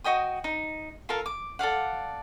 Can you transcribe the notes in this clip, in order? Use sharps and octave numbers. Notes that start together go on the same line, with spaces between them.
F#4 D#5 G5 D#6
D#4
F4 A4 A#4 F5
D6
A4 D5 F5 F#5